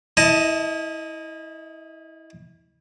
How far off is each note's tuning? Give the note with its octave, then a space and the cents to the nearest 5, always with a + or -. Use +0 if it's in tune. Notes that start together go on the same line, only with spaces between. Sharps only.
E4 -25 D#5 +5 A5 +0